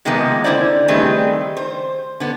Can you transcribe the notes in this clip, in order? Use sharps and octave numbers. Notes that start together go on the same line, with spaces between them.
C3 D#3 F3 G#3 A#3 B3
D3 E4 C5 D5
D#3 G3 A3 C4 G#4 B4
C5
D3 B3